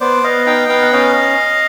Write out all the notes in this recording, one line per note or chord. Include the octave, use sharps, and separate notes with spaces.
B3 C5 D5
B3 D#5 F5
D#4 F5 G5
B3 F5 G5
F#5
C#4 D#5 F5